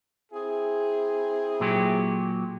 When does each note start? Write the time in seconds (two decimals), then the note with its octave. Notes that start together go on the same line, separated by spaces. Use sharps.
0.32 C4 E4 G#4
1.60 A#2 F#3 G4